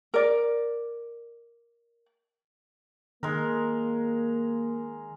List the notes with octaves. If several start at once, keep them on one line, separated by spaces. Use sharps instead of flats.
A#4 D5
D#3 G#3 A#3 A#4